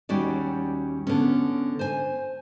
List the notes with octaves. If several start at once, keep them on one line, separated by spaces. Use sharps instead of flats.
D#2 G3 C#4 F#4 D5
D3 B3 C#4
C5 G#5